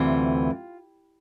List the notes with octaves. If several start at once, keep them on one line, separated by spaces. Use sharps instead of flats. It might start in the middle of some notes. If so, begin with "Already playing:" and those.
Already playing: D2 C3 E3 F4